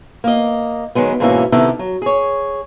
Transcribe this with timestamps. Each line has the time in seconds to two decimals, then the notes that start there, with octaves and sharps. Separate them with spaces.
0.24 A#3 D#5
0.95 D#3 F#3 G#3 B3
1.20 G#2 B2 E3 A#3 C#4 E5
1.52 C3 D#3 B3 E4 G4 A4
1.79 F#3
2.02 G#4 C#5